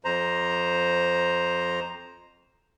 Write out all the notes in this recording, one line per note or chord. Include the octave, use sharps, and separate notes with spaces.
F2 C5 A#5